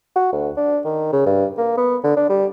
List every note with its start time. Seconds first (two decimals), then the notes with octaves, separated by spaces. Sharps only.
0.16 F#4
0.33 D2
0.57 D4
0.85 D#3
1.13 C#3
1.26 G2
1.58 A#3
1.77 B3
2.04 D3
2.17 D4
2.30 G3